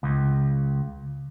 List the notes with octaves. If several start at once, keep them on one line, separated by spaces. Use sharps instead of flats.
C#2